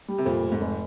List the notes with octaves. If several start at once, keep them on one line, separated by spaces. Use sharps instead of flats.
G3
C3
F2 A#2
F1
G#2
F1